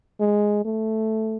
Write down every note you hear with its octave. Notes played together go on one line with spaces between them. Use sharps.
G#3
A3